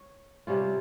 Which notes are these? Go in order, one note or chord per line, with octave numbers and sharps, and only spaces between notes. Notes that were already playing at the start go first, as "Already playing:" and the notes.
Already playing: C#5
C3 G3 C#4 F4